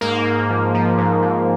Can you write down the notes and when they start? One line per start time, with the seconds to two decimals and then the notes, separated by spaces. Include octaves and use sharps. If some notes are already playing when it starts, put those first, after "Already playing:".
0.01 G#2 A#3
0.25 G#2
0.50 F3
0.75 F3
0.98 G#2
1.22 G#2